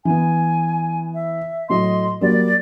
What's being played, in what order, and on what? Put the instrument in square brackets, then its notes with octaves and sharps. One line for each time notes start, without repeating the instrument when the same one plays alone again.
[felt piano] E3 B3 [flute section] G#5
[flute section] E5
[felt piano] A2 F#3 [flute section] D#5 C6
[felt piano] F#3 G3 A#3 [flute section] D5